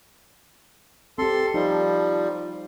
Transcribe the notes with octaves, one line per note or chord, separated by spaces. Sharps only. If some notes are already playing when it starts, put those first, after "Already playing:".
C4 G4 A4 C6
F3 G3 D#4